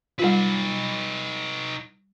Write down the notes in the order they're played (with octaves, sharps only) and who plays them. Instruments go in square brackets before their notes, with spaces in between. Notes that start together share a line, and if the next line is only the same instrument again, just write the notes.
[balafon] G3 F4 [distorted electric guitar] D#4 B4